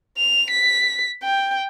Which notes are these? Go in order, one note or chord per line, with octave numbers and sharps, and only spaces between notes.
F7
B6
G5